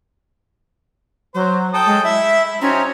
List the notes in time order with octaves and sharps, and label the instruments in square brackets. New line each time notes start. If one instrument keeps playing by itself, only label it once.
[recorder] F#3 [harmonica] C5
[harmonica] A4 G5 D#6
[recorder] G#3
[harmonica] E4 [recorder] E5
[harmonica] F#3 C4 D#4 [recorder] C#4